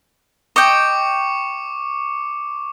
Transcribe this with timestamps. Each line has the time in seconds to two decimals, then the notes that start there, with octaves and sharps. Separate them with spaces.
0.56 D#5 G5 C#6 D6 C#7